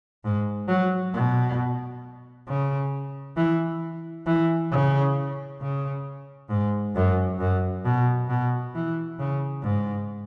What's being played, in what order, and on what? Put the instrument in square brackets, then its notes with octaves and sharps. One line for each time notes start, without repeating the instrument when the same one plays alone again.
[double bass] G#2
F#3
B2
C#3
E3
E3
C#3
C#3
G#2
F#2
F#2
B2
B2
E3
C#3
G#2